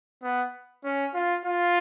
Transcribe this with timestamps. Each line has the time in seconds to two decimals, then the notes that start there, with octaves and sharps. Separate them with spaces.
0.23 B3
0.84 C#4
1.14 F4
1.46 F4